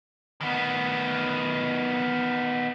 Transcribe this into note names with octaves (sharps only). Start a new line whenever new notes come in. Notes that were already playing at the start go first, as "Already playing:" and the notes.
D#3 B3